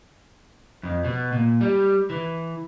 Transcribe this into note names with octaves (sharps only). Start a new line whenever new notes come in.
F2
B2
A#2
G3
E3